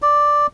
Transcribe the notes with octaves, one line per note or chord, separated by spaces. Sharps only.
D5